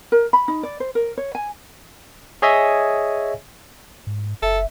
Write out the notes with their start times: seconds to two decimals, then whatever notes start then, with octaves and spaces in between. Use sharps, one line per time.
0.12 A#4
0.33 B5
0.48 D#4
0.63 D5
0.80 C5
0.95 A#4
1.18 C#5
1.35 G#5
2.42 G#4 C#5 D#5 E5 G#5
4.07 G#2
4.42 F#1 A4 E5